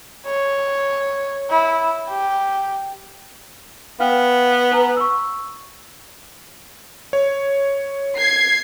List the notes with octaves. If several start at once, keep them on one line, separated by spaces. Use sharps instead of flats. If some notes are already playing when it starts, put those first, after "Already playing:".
C#5
E4
G4
B3 F5 G5 F6
B4 G#5 A#5
C#6 E6
C#5
G#6 C7